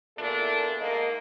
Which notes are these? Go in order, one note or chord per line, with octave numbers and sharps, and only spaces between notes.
E2 A#2 D4 E4 A4
G#2 A#3 D#5